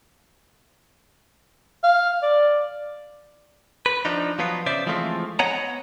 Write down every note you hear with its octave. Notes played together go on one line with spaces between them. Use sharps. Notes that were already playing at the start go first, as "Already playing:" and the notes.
F5
D5
B4
F3 D4 D#4
F3 F#3 B3 F4
C#3 C5 D5 E5
E3 F3 G#3 A3 C4 F4
B3 C#5 D#5 F#5 G#5 A#5